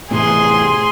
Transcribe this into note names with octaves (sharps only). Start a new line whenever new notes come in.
A2 C3 E3 G#4 C6